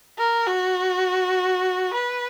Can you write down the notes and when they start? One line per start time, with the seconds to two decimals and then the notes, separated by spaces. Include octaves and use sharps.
0.18 A#4
0.47 F#4
1.93 B4